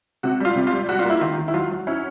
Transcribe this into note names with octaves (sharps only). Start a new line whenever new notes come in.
C3 F#4
G3 F4
C3
F4
G3
G3 F#4
F4
A#3 E4
D#3 F4
D#3
E4
F#3 F4
F#3
C#4 E4